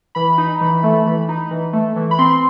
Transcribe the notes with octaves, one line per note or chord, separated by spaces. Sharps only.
E3 B5
D#4
E3
A3
E3
D#4
E3
A3
E3
B5
C4 C6